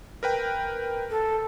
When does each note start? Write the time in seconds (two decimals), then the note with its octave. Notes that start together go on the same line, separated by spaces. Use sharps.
0.23 A#4 B4 G5
1.10 A4